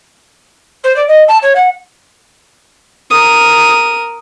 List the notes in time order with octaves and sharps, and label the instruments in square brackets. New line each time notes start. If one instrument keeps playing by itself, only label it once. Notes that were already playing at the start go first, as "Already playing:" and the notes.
[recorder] C5
D5
D#5
A5
C#5
F#5
[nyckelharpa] A#4 D#6